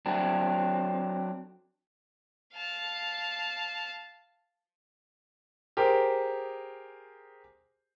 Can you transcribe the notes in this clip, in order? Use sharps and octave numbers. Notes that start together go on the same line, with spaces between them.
F#3 C4 D4
F5 A5
G4 G#4 A#4 C5